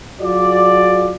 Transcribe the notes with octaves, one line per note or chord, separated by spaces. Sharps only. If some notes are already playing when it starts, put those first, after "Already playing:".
F#3 F4 F#4 G#4 D5